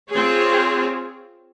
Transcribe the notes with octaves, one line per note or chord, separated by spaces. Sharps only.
C4 F4 G#4 C#5